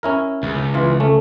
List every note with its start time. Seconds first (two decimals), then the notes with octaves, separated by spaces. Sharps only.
0.03 C#4 E4 A#4
0.43 C#2
0.74 E3 F4
1.00 A3 C#4